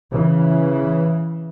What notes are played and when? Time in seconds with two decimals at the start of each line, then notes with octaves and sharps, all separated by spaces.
0.11 C#3 E3